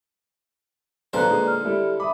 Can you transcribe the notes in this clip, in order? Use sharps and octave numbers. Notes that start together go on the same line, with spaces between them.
D#1 B1 D3 B4 C5 A#5 F#6
A#2 G#3 D#4
F6
G3 E4 A4
E5 B5 D6 D#6